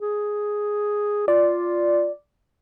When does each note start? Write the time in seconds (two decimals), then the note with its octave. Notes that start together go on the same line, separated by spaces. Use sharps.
0.01 G#4
1.28 F4 D5